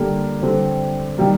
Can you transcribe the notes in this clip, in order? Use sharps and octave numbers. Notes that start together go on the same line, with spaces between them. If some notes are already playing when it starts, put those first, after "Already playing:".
Already playing: D3 G3 A#3
D3 G3 C4
D#3 G3 A#3